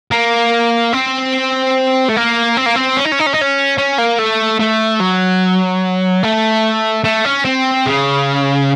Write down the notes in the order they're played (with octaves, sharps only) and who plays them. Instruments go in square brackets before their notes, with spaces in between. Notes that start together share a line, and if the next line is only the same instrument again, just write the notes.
[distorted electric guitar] A#3
C4
A3
A#3
C4
A#3
C4
C#4
D#4
C#4
D#4
C#4
D#4
C#4
C#4
A#3
A3
A3
F#3
A3
A3
C#4
C4
C#3